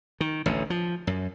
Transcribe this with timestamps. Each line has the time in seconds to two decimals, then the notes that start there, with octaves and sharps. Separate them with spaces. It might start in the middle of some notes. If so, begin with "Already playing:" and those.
0.21 D#3
0.46 A1 D2 D3
0.70 F3
1.07 F#2